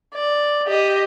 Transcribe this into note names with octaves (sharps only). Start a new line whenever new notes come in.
D5
G4 D#5